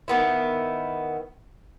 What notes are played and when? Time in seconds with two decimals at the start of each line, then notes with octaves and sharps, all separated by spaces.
0.08 D#3 B3 E4